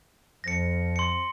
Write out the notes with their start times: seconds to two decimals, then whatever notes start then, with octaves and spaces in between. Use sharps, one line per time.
0.44 F2 F3 A#6 C#7
0.96 C6 C#7